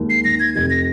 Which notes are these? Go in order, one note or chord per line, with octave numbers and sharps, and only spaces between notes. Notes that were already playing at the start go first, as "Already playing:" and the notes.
Already playing: D#2 G#3
C7
D#3 A#6
G#6
F1 G#6
A#6